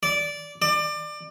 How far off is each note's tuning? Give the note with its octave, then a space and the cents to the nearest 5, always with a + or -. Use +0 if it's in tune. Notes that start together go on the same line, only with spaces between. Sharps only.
D5 -15
D5 +25